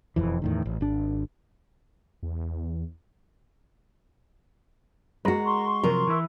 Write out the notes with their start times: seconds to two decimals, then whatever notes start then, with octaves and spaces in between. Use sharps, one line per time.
0.16 E1 C2 F2 E3
0.42 E2 A2 D#3
0.66 A1
0.81 G#1 D4
2.23 E2
5.25 G#3 F#4 A#4
5.44 C6 C#6
5.83 C3 F3 F#3 A#4
6.07 E3 E4